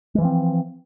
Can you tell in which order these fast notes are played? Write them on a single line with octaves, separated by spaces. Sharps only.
G#3 E3 F3 C4